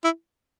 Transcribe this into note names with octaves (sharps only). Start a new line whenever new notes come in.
E4